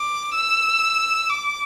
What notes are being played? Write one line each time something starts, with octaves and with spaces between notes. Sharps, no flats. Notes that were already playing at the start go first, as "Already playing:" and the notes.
Already playing: D6
E6
D6